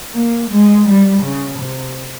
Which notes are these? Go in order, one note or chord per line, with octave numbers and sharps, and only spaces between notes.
A#3
G#3
G3
C#3
C3